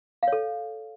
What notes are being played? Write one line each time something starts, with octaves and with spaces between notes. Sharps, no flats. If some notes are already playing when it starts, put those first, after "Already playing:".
A4 C#5 F5